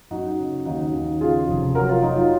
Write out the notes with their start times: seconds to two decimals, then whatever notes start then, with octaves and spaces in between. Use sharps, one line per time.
0.11 F#2 D#4 F#4
0.39 C#3
0.66 D#2 D#4 F#4
0.94 D#3
1.21 C#3 F4 G#4
1.48 F1
1.75 F#3 F#4 A#4
1.89 F4
2.02 F#3 D#4
2.16 F4